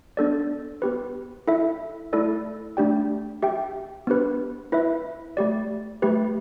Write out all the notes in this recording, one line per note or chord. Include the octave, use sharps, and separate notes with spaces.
B3 D4 A4 D5
B3 G4 B4
E4 A4 E5
A3 E4 A4 D5
A3 D4 G4 D5 G5
G4 E5 G5
B3 D4 G4 B4
E4 B4 E5
A3 G4 D5
A3 G4 B4